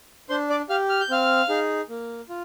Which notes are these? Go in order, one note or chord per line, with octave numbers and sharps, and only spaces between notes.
D4 C5 C6
D5 D6
G4 F5 F6
F6
G6
C4 F5 F6
D#4 G#4
A#3
F4